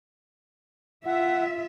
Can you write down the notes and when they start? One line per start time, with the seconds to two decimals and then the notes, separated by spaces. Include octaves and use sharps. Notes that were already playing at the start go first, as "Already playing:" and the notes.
1.06 F4 E5 F#5